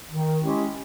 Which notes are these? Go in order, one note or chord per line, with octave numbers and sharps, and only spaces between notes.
D#3
G#3 C#4 E4 G4